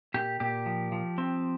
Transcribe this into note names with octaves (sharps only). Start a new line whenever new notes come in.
A#2 G4
A#2 G4
F3
F3
C4